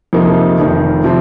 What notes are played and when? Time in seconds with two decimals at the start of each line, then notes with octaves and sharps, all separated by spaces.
0.13 F2 C3 F3 A#3 D#4
0.59 F1 F2 D#3
1.04 C3 F3 C4